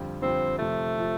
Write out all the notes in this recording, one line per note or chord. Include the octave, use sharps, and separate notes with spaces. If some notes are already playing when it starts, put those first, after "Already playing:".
Already playing: F2 D3 G3 F4
F2 D3 G3 C4 F4
F2 C3 F3 A3
C3 F3